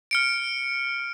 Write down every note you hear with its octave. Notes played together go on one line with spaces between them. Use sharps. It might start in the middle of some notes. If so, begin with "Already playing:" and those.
F6 C#7 D7